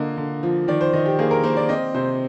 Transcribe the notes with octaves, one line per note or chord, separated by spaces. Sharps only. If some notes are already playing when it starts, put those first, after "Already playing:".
Already playing: D3 A#3 D#5
D3
F3
D#3 D5
C5
D#3 D#5
G4
A#3 G#4
A#4
A#3 C5
D5
C4 D#5
C3 C5